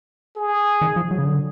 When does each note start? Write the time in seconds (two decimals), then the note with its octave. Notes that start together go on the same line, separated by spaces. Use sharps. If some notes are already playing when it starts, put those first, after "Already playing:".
0.37 G#4
0.81 D#3
0.96 F3
1.11 F#3
1.18 C#3
1.25 D3